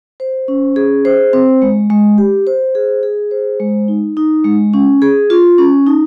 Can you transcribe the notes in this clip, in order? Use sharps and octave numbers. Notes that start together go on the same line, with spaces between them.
C5
C#4
G#4
C5
C4
G#3
G#3
G4
C5
G#4
G#4
C5
G#3
D#4
D#4
G#3
C#4
G#4
F4
C#4
D#4